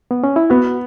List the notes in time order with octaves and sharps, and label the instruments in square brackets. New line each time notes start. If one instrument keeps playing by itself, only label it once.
[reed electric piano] B3
C#4
E4
[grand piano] B3 [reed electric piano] F#4